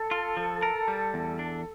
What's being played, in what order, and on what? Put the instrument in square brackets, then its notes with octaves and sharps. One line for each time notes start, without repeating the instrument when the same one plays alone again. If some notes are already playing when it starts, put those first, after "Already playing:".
Already playing: [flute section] A4
[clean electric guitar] F4
F3
A#4
G3
E2
D4